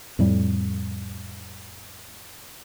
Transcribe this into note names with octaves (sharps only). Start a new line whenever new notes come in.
F2 A2 G3